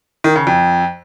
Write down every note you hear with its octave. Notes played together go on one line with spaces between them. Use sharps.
D#3
C#3
F2